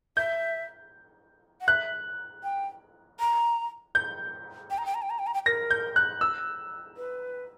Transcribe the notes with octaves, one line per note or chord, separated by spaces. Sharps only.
E5 G6
F#5
E5 F#6
G5
A#5
G6
G5
A#5
G5
A#5
G5
A#5
G5
A#5
G5
A#4 A#6
G6
F#6
E6
B4